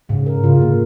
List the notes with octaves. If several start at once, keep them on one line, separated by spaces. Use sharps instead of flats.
G#2 C#3
A#4
C#3 F4
G#2
A#3